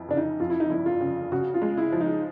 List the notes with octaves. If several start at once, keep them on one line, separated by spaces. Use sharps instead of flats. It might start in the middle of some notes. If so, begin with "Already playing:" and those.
Already playing: F2 E3
C#3 D4
D#4
F2 F4
E4
D#4
G1 E4
F4
C#3
C#3 F#4
F4
G#3
E4
F3
D#4